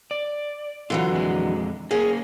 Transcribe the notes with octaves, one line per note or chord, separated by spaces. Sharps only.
D5
D3 E3 F#3 F4
F2 G#3
A#3 C#4 G#4